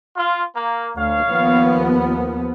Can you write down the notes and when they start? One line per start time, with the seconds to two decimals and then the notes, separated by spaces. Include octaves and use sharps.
0.16 F4
0.55 A#3
0.97 D2 C#5 F5
1.27 D#2 F3 B3